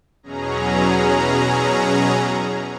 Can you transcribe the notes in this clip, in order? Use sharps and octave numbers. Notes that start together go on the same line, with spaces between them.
E2 B2 F#3 C#4 G#4 A#5